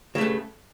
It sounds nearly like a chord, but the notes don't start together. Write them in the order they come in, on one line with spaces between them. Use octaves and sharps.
C#3 A3 G2